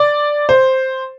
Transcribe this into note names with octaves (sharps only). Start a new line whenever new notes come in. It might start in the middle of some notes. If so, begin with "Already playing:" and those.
Already playing: D5
C5